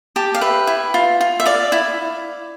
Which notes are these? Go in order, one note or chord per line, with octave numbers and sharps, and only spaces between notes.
G4 A5
F5
B4 E5
E4
F4
F4
E5
D5 F5
E4